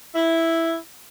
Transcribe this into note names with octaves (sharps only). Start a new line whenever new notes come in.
E4